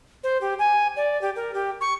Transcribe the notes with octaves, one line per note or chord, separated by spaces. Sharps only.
C5
G4
G#5
D5
G4
A#4
G4
C#6